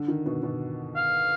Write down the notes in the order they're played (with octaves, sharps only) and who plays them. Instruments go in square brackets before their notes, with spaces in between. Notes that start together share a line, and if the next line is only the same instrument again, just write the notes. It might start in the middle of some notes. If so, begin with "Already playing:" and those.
Already playing: [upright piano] D3
D#3
B2
B2
[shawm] F5